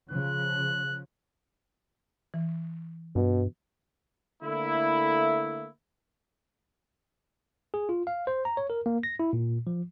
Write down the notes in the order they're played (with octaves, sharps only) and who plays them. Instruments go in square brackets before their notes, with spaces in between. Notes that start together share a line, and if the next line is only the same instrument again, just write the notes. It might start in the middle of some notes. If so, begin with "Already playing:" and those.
[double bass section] C#3 F3 [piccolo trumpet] F#6
[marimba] E3
[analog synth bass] G2 [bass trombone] B2
[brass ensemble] D3 A3 A#3 E4
[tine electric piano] G#4
F4
F5
C5
A#5
C#5
A#4
A#3
A#6
E4
A#2
F3